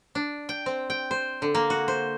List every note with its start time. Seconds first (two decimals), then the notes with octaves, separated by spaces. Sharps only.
0.15 D4
0.49 G5
0.66 C4
0.90 G5
1.11 C5
1.42 D3
1.55 A#3
1.70 F#4
1.88 C5